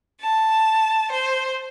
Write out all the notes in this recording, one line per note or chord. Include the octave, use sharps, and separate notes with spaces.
A5
C5